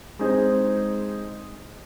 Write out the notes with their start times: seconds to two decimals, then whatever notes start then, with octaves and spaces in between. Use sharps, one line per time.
0.19 G#3 C4 D#4 G#4 C5